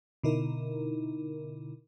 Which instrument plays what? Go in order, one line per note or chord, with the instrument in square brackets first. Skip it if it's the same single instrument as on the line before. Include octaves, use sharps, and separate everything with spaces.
[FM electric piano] B2 D3 D#4 E4 A#4